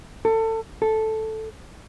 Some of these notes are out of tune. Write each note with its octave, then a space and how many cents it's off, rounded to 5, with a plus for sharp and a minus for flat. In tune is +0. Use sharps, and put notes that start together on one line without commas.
A4 +25
A4 -5